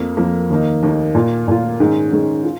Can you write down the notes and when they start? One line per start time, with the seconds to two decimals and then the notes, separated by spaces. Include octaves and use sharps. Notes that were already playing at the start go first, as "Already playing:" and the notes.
Already playing: F2 F3 A#3
0.17 F2 F3 A#3
0.50 D#2 D#3 A#3 D#4
0.83 D#2 D#3 A#3 D#4
1.15 A#2 A#3 F4
1.48 A#2 A#3 F4
1.80 G#2 D#3 G#3 C#4
2.12 G#2 D#3 G#3 C#4
2.44 F4